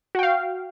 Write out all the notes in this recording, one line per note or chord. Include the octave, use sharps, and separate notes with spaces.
F#4 F5 G5